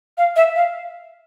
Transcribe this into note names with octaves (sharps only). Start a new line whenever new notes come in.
F5
E5
F5